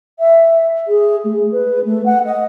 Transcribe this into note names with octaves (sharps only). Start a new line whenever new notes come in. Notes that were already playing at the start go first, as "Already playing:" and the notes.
E5
G#4
A3
B4
A3
F#5
D#5